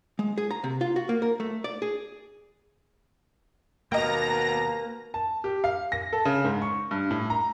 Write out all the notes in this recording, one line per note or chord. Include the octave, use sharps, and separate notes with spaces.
G#3
G#4
A#5
C3
F4
F#4
A#3
A#4
A3
D5
G#4
D#2 B2 A#3 D#5 G5 A#5 A#6
A5
G4
F5
A#6
A4
C#3
G#2
C#6
G2
A2
A#5